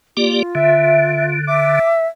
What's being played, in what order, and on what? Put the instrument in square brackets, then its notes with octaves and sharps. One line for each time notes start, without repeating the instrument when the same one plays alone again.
[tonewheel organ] A#3 G4 D5 [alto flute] F4
[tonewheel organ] D3 [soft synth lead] E5
[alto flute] E5 [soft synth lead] D6